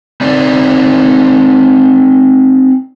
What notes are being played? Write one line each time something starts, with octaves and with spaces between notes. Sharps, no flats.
C4 D#4 G#4 D5